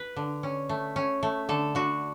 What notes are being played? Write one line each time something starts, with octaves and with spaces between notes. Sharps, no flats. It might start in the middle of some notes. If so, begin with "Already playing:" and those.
Already playing: B4
D3
C#4
A3
C#4
A3
D3 A4
D3 F#4